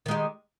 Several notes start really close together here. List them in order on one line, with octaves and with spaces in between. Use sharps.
D#3 G#3 G4